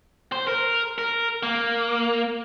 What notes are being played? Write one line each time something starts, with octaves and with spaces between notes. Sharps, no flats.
C5
A#4
A#4
A#3